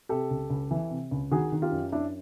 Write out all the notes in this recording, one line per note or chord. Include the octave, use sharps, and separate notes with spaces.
C3 G4 A4
C#2
C#2
E3
C3
C#2
D#3 F#4 G#4
D#3
F4 G4
F#2
F#2 D4 E4